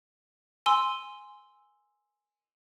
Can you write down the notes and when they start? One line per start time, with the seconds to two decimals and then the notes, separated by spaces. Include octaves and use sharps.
0.66 G#5 C6 E6